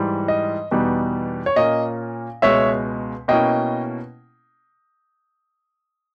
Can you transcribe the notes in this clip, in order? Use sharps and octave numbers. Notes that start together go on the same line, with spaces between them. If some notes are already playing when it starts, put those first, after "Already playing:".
Already playing: G#2 E3 G3
D#5
E2 B2 G3 B3 D#4
C#5
A#2 A#3 C#4 D#5
C#2 B2 G#3 C#5 E5
B2 A#3 C#4 E4 D#5 G5